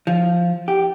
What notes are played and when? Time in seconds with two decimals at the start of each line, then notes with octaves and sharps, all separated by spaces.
0.07 F3
0.68 G4